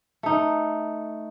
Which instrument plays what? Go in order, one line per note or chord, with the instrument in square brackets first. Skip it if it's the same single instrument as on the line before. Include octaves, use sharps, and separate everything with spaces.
[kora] A3 D#4